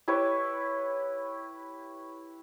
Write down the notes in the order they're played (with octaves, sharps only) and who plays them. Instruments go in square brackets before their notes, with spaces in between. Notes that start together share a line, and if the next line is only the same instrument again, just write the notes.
[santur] E4 G4 B4 C#5